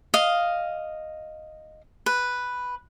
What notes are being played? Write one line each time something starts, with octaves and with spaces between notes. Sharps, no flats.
D#5 F5
B4